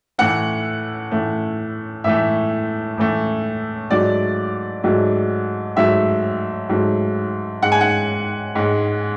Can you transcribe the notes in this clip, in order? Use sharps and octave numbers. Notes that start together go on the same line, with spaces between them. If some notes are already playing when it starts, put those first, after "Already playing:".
A2 E3 A3 F#5
A2 E3 A3
A2 E3 A3 E5
A2 E3 A3
G#2 F#3 A3 D5
G#2 F#3 A3
G#2 F#3 A3 E5
G#2 F#3 A3
G#2 G#3 F#5
G#5
F#5
G#2 G#3